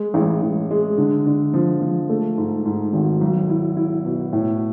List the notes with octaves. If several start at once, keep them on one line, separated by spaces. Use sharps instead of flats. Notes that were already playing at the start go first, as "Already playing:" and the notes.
Already playing: G#3
A1
A1
G#3
D3
D3
F3
F3
A3
G#2
G#2
G#1
B1
E4
E4
B2
A2